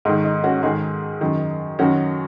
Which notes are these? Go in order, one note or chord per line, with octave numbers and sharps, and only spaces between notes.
G#2 D#3 D#4
D#4
C#4 F#4
G#2 D#3 D#4 G#4
F#2 D#3
F#2 D#3 C#4 F#4